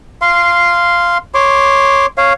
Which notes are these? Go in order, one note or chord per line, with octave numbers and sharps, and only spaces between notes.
F5 C6
C#5 C6 D6
C#5 F5